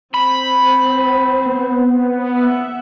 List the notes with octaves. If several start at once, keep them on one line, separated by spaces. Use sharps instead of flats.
C4 C5 B5
B3
E5 F#5